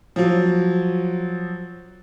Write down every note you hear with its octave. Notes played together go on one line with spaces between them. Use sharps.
F3 F#3